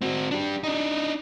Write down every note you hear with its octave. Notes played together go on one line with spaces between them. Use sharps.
C4 F#4
D4 G4
D4 D#4